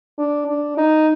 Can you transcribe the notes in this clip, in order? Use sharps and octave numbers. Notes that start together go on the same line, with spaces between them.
D4
D4
D#4